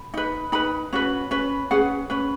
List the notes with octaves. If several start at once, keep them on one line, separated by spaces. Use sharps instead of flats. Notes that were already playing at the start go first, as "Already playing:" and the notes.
Already playing: B5
D#4 B4
D#4 B4 B5
C#4 F#4 B4
C#4 B4
C#4 G#4 B4 F#5
C#4 B4